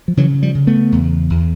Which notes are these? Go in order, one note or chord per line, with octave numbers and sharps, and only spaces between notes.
F3
C#3 E3 F#3
F3 G3
C#3
A3 B3
E2
E2